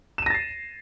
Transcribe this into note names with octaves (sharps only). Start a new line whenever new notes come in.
A6 A#6 C7 D#7 E7